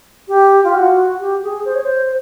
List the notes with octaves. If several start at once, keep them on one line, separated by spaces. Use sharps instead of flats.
G4
F4
F#4
G4
G#4
C5
C#5
C5
C5